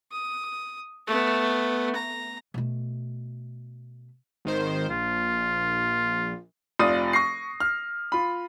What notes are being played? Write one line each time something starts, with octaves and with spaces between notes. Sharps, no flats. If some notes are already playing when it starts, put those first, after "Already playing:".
D#6
A3 B3
A#5
B2 A3
G#1 D#3 C5
A#1 F4
F1 F4 D5 D#6 D#7
C#6 A#6 C7
F6
F4 B5